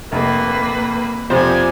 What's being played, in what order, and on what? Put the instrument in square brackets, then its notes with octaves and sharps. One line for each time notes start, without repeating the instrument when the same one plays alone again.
[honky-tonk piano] F1 [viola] A#3 B4
[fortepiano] F2 C3 [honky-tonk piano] C5 [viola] D5 G#5